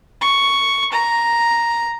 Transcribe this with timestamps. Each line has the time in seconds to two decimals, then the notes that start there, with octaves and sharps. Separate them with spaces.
0.21 C#6
0.93 A#5